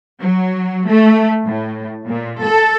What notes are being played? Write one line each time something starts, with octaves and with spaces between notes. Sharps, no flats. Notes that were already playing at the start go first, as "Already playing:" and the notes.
F#3
A3
A2
A#2
A4